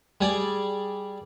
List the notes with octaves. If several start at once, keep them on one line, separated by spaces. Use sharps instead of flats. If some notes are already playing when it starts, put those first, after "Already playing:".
G3 G#4 D5